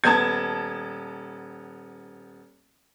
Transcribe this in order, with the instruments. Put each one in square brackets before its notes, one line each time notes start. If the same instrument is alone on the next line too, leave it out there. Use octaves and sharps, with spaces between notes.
[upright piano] D#1 B3 A5 [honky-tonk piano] G#6